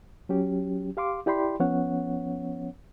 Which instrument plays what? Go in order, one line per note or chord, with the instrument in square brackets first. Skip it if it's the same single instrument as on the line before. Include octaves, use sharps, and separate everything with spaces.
[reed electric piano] F#3 C#4 G4
G4 F5 C6 D6
E4 G4 D5 G5 B5 C6
F3 B3 C#4 C#5 F#5